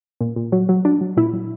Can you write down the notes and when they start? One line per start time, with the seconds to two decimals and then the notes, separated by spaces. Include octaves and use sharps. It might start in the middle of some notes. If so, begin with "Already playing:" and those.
0.21 A#2
0.36 A#2
0.52 F#3
0.69 F#3
0.85 F#3 D4
1.01 F#3
1.17 A#2 E4
1.33 F#3